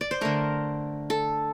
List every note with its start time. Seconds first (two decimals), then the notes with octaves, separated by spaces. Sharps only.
0.01 D5
0.11 C5
0.21 D3 A3 A#4
1.10 A4